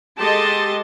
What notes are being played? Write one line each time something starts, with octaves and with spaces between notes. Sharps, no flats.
G#3 G4 A4 D#5 A5 C6